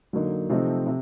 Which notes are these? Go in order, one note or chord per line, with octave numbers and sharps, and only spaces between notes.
D3 F#3 A#3 D#4
C3 F3 A3 C4 D#4
C3